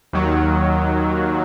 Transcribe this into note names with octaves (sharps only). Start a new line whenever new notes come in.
D#2 D#3 F#3